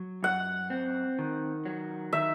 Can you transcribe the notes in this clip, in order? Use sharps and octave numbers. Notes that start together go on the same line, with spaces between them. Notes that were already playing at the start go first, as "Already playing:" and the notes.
Already playing: F#3
F#2 F#5
C4
D#3
F#3
D#3 E5